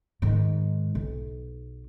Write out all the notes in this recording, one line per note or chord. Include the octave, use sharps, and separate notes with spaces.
G#2 D#3
B1